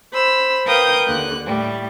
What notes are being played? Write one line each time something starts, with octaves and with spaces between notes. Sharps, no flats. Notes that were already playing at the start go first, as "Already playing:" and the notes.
C5 B5 E6
A#4 B4 F5 G5 D#6 G6
D#2 D3 F#6
A2 G3